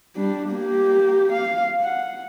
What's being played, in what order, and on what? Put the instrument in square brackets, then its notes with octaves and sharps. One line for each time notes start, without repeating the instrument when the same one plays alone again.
[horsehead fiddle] G3 D4
A#3 G4
F5
F#5